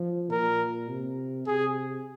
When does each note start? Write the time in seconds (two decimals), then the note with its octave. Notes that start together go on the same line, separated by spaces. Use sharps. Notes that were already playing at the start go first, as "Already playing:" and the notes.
Already playing: F3
0.30 A#2 A#4
0.89 C3
1.47 C3 G#4